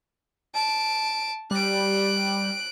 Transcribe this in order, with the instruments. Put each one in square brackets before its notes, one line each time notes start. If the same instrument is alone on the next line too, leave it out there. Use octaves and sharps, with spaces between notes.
[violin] A5 D7
[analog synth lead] G3 [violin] F#6 D7